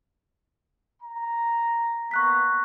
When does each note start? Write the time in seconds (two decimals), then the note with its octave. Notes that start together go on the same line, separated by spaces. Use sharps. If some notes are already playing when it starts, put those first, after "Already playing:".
1.02 A#5
2.11 A#3 B3 A#5 C#6 F#6 B6